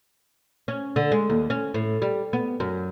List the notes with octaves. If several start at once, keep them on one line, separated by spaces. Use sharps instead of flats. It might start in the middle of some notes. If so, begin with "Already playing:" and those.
C#4
D3
G#3
D#2
C#4
A2
G3
B3
F#2